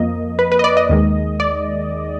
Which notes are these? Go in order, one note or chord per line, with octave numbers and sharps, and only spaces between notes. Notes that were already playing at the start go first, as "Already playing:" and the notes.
Already playing: F2 F3 A#3 D#5
B4
B4
D#5
D5
D#5
D#2 D#3 G#3
D5